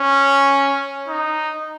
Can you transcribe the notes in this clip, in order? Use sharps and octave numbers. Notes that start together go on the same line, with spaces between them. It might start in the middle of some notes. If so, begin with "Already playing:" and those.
Already playing: C#4
D#4